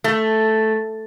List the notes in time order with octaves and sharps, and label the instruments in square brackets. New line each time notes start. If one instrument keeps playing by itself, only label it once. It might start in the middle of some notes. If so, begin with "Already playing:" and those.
[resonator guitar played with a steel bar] A3